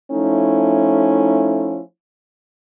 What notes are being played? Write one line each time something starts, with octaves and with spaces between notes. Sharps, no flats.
F3 A3 C#4 D#4 E4